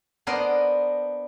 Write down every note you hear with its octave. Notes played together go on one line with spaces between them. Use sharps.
B3 D4 A#4 C5 D#5